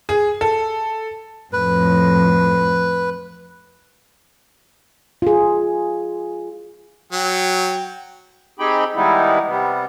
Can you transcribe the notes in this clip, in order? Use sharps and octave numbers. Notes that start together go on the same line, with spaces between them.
G#4
A4
F2 A2 B4
F4 G#4
F#3 G5
C4 D#4 G4 G#4 G5 B5
D#3 G3 G#3 B3 D#4 E4
C3 G3 B3